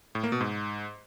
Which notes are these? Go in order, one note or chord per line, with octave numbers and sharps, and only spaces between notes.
A2
A#3
B2
G#2